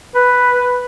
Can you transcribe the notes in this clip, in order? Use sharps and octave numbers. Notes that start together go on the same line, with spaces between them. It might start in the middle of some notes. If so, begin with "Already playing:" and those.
B4